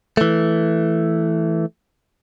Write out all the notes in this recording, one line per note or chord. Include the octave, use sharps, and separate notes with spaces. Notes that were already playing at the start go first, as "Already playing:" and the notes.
E3 A3